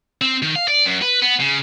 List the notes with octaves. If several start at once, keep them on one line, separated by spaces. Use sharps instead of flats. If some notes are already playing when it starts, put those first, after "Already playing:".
C4
D#3
F5
D5
F#2
B4
B3
C#3